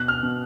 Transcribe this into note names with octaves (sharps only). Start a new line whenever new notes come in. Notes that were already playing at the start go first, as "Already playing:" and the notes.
Already playing: B2 F#6
F6
B2